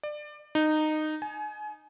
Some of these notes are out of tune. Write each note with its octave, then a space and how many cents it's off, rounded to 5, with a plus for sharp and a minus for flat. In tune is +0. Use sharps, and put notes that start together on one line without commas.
D5 +25
D#4 -15
G#5 +30